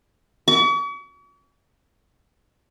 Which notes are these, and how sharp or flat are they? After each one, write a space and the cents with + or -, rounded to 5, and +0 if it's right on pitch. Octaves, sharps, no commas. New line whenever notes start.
C#6 +45